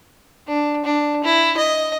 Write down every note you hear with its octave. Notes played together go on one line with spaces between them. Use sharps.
D4
D4
E4
D#5